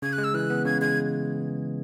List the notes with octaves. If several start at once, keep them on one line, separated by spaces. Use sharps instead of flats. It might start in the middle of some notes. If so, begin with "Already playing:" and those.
C#3 G#6
F#6
G#3
E6
E3 F#6
B3
C#3 G#6
G#3 G#6